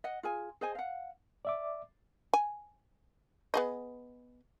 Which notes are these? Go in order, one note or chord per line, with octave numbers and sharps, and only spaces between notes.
D#5 F#5
F4 G#4 G#5
G#4 C5 D#5 G#5
F5 F#5
D5 E5 D6
G#5
B3 G#4 D#5